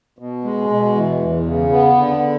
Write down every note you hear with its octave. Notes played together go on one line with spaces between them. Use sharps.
B2
G#3
B2
E3
E2
C#3
B3
D3